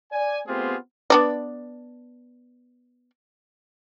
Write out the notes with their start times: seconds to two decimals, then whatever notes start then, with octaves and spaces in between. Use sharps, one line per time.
0.12 D5 G#5
0.46 A3 B3 C4 F4 G4 G#4
1.10 B3 D4 D5